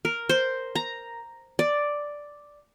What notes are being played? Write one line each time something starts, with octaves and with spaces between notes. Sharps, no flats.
A#4
C5
A#5
D5